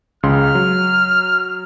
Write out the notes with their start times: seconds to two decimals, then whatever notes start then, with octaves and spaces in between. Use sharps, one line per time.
0.23 C#2 C#3 C6 F6
0.55 F#3